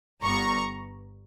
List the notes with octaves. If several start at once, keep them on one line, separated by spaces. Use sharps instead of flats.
G1 G2 G3 B3 A#5 C#6